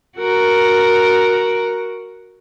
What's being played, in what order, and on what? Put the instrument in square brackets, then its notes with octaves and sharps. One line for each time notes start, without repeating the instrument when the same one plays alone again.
[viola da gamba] F#4 A#4